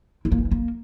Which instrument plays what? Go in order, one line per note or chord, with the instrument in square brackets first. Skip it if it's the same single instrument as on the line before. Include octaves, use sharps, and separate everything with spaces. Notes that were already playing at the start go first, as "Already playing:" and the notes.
[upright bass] E4
A#3
E3
G3
A#3